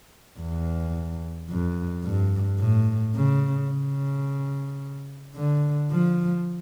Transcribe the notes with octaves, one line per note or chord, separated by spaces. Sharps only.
E2
F2
G2
A2
C#3
C#3
D3
F3